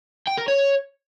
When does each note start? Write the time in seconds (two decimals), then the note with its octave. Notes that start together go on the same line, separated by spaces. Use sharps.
0.28 G5
0.38 A#4
0.48 C#5